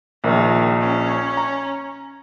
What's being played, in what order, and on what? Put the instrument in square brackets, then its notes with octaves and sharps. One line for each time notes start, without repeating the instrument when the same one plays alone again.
[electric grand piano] A#1 A#4 [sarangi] D#3
[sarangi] C#4
[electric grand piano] A#5